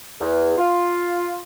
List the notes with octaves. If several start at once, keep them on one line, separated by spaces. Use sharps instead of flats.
E2
F4